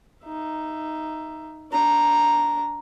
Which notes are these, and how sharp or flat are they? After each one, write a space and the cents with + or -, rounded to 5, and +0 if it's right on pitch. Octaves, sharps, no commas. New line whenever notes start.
D#4 +0 E5 +15
D4 -15 A#5 +0